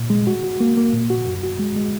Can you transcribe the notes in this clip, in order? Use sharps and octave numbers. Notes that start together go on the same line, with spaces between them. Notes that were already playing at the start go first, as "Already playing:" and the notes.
Already playing: A#2
G#3
F#4
F#4
A#3
A#3
A#2
F#4
F#2
F#4
G#3
G#3